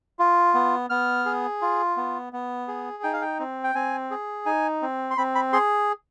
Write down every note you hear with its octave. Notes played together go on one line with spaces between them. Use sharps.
F4
B3
B3 F6
G#4
F4
B3
B3
G#4
D#4 G5
F5
G5
C4
G5
C4 G#5
G#4
D#4 G#5
C4
C6
C4 B5
B5
G#4 C6